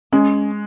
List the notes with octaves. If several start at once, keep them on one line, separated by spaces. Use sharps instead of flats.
G#3 C#4